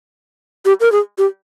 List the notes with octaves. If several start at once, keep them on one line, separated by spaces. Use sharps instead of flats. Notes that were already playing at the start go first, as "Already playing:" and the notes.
G4
A#4
G#4
G4